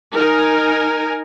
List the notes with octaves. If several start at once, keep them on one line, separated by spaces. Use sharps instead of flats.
D#4 A#4 G#5